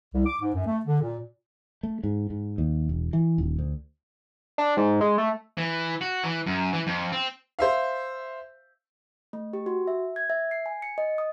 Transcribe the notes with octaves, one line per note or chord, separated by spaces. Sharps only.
C2
D6
G#2
F#2
A3
D3
A#2
A3
G#2
G#2
D#2
E1
E3
D#1
D2
D4
G#2
G#3
A3
E3
F#4
E3
F#2
E3
F2
C4
C5 E5 F5
A3
G4
F#4
E5
G#6
E5
C7
G#5
C#7
D#5
D#6